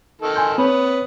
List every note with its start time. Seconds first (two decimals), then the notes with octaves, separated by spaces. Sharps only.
0.22 D#3 A4
0.36 G#5 C6 G6
0.58 C4 B4 C#5 D#6